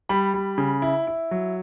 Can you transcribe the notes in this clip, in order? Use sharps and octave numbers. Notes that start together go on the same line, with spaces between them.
G3 B5
G3
C#3
E4
E4
F#3